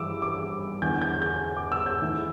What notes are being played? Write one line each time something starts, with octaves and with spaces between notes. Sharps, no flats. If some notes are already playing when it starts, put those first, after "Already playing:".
Already playing: G2 E3 D6 E6
D6
E2 D3 G6
G6
G6
D6
E6
G6
A2 E3